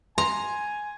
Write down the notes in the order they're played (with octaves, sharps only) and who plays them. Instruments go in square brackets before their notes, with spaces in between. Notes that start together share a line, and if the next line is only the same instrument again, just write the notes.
[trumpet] G#5 [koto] A#5 [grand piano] C6